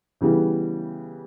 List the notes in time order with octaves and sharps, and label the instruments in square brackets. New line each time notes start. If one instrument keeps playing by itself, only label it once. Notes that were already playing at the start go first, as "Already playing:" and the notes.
[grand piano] C#3 E3 G3 B3